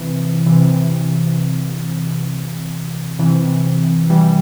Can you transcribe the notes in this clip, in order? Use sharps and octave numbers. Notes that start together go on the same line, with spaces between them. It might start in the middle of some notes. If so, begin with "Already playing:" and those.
Already playing: C3 E3
C3 E3
C3 E3
E3 G3